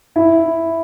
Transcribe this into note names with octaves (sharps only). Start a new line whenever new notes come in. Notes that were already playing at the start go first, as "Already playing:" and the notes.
E4